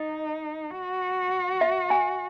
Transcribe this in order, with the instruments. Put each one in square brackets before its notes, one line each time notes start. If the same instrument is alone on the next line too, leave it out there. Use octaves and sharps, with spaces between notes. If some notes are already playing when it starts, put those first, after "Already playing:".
Already playing: [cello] D#4 [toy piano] D#5
[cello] F#4
[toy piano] E5
G#5